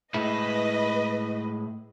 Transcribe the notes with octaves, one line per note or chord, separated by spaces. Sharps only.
A2 G#3 E4 B4 D#5